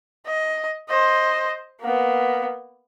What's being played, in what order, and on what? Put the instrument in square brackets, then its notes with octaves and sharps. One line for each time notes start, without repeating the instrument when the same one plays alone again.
[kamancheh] D#5
C5 D#5
A#3 B3